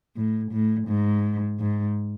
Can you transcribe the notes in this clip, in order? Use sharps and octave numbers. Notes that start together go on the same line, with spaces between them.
A2
A2
G#2
G#2